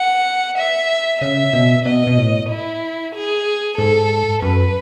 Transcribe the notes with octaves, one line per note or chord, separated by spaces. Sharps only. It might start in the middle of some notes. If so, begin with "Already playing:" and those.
Already playing: F#5
E5
C#3 E5
B2
B2 D#5
B2
A2
E4
G#4
G#2 A4
F#2 B4